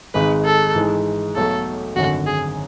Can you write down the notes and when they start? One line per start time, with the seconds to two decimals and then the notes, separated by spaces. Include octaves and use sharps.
0.14 G#1 G#2 G#3 B4
0.45 A4
0.75 G#2 E3 G#3
1.36 B1 B2 F#3 A3 A4
1.96 G#1 F#2 D3 F#4
2.26 G#4